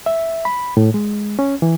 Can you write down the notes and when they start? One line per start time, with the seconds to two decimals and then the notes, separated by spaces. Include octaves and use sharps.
0.06 E5
0.45 B5
0.77 A2
0.94 G#3
1.39 C#4
1.62 E3